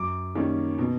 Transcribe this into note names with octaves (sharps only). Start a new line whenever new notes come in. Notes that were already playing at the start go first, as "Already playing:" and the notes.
Already playing: F#2 D6
D#3 G3 A#3 C#4
B2